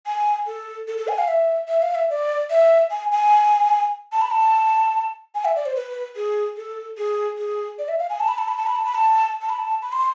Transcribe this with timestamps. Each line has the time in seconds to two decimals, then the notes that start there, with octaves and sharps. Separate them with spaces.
0.07 G#5
0.47 A4
0.87 A4
0.98 A4
1.08 G#5
1.18 F5
1.28 E5
1.68 E5
1.82 F5
1.95 E5
2.10 D5
2.50 E5
2.91 G#5
3.12 G#5
4.12 A5
4.21 B5
4.31 A5
5.35 G#5
5.45 E5
5.56 D5
5.66 C5
5.76 B4
6.16 G#4
6.57 A4
6.98 G#4
7.38 G#4
7.79 D5
7.89 E5
7.99 F5
8.10 G#5
8.20 A5
8.28 B5
8.38 A5
8.48 B5
8.57 A5
8.66 B5
8.76 A5
8.85 B5
8.95 A5
9.42 A5
9.49 B5
9.59 A5
9.82 B5
9.92 C6